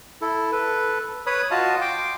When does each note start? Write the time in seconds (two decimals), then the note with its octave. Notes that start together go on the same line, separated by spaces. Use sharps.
0.21 E4 A4
0.52 A4 B4
1.26 B4 C#5 B5 D#6
1.51 F4 F#4 D#5 F5 A5
1.81 G5 C6 D6